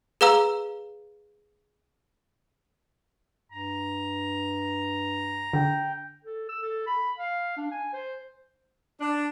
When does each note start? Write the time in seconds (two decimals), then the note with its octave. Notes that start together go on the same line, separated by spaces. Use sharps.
0.21 G#4 B4 F5 A#5 E6
3.52 G2 A#5
5.53 D3 G5
6.24 A4
6.49 E6
6.62 A4
6.87 B5
7.18 F5
7.57 D4
7.71 G#5
7.93 C5
9.01 D4